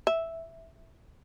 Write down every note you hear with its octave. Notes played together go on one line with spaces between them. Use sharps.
E5